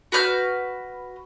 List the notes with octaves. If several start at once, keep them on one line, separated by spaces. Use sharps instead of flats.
F#4 B4 F6 G6